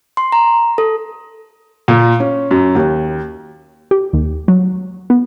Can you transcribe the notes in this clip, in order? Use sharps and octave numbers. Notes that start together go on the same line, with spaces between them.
C6
A#5
A4
A#2
C#4
F#2
D#2
G4
D#2
F#3
B3